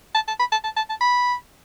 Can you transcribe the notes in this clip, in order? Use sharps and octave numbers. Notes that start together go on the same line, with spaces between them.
A5
A5
B5
A5
A5
A5
A5
B5